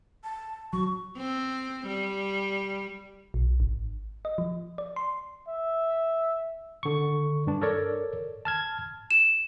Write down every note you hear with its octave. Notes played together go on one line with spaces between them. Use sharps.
A5
F#3 C#6
C4
G3
B1
G#1
D#5
F3
D5
C6
E5
D3 C#6
G2 D4
A4 A#4 C#5 D5
A5 F6 G#6
E7